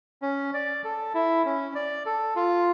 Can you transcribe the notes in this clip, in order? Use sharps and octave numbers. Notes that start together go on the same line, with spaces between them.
C#4
D5
A4
E4
C#4
D5
A4
F4